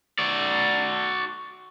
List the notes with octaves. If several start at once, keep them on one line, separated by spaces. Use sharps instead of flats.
F#4 D5